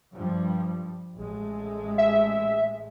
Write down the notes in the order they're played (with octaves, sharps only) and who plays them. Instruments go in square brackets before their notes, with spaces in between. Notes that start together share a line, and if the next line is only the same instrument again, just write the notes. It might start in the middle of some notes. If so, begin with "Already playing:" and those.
[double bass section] G2 F3 G3
A1 G#3 A3
[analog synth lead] E5